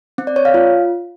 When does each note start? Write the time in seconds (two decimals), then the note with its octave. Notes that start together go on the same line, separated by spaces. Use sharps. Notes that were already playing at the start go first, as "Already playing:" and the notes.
0.18 C4
0.27 D5
0.36 C#5
0.45 F5
0.54 F4